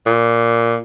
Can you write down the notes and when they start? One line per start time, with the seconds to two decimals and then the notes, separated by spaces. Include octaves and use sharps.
0.06 A#2